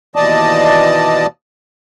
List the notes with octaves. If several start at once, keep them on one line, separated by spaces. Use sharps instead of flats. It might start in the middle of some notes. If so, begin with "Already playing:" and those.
D#2 B2 E3 D5 D#5 A5